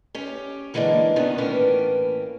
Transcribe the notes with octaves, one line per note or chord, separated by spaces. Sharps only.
C#4 G4 C#5
D3 E3 G#3 A#3 D4
C3 D#3 F3 B3 C#4 D4
A2 E3 A#3 C#4 B4 G5